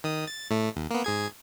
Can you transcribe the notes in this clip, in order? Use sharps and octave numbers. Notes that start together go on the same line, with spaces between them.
D#3 D#6
A6
A2 A3
D#2
A#3 B3
G#2 G#4 G#6